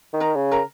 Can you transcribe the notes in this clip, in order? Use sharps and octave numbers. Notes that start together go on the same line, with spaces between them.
D#3
A#4 A#5
C#3
A#4 A#5